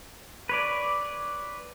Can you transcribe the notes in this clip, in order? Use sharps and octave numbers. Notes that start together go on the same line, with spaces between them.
B4 C#5 D5